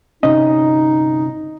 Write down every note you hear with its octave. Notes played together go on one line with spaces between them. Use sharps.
G1 C3 C#4 D#4 D#5